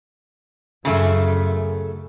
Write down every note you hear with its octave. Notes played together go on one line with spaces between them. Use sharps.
F#2 C#3 A3